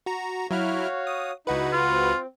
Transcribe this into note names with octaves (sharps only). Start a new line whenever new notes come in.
F#4 A#5
F#3 E4 F#4 C#5 F5 F6
D#6
C#2 D#4 E4 F#4 B4 E5
F4 F6
C4